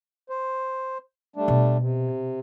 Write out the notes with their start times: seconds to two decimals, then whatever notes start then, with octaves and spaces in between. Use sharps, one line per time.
0.29 C5
1.36 G3 A3 D4
1.48 B2
1.79 C3